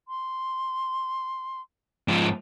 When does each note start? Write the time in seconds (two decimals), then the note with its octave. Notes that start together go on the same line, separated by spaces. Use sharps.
0.08 C6
2.08 G#2 F3